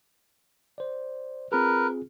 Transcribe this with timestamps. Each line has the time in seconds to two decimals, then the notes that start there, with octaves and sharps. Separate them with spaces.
0.78 C5 D5
1.52 C4 F4 G#4 A#4 B4